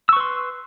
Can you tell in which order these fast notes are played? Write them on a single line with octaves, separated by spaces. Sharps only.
E6 C#6 B4 C6